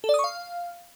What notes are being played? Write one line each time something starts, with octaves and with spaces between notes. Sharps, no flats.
A4
D5
D#6
C#6
F5